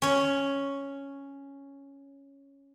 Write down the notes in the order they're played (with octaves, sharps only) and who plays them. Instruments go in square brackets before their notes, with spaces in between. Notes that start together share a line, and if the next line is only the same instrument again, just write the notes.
[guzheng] C#4 C#5